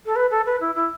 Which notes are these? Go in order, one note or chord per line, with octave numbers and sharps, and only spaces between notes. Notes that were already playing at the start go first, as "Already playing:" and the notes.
A4
B4
A4
B4
E4
E4